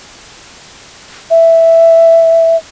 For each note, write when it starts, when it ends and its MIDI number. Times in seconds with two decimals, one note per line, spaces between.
1.30 2.56 76